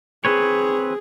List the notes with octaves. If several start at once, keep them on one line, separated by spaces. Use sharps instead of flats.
C4 G#4 B4 C#5